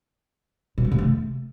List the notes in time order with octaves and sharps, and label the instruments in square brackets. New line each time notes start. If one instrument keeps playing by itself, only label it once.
[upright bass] B2
G#3
C3
A3